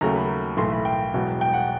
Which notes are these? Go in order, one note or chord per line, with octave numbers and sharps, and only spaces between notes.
D#2 C#3 F#3 A3 A#5
B5
B1 A2 E3 A3 C6
B5
G5
E1 E2 B2 F#3
G5
F#5